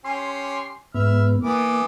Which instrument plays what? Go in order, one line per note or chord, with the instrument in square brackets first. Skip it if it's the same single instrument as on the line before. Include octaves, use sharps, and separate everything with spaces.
[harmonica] C#4 G4 [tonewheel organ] C6
[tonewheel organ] G#2 B3 [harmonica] E5 F6
[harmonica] E3 B3 D6 [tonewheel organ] A#3